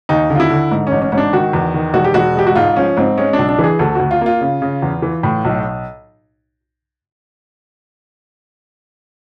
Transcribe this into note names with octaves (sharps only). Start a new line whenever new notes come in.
D#2 D#4
D3 F4
E4
D3
G#2
A1 C#4
C#4
G#2 C#4
D4
D#3 F#4
E2
D#3
E1 F#4
G4
E1 F#4
G#3 G4
F#4
G#2 F4
F3 C#4
G#2 C4
G#3 C#4
D4
B1
D4
E3 G#4
D2 A4
D2 F#4
F4
A#3 F4
C#3
C#3
E2
E3
A2
B1